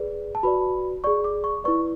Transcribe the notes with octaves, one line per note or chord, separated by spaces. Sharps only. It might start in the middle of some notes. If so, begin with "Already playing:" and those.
Already playing: G#4 B4 D5
A5
F#4 B4 D5 B5
G#4 D5 C#6
D6
C#6
E4 B4 D5 C#6